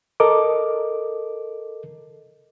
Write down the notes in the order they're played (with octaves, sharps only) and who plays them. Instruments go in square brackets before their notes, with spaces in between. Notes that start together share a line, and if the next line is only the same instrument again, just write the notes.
[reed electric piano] A4 A#4 D#5 D6